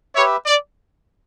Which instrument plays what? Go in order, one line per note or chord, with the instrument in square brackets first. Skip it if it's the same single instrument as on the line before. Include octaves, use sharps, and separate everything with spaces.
[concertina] G4 B4 E5 [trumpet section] C#5
[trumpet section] D5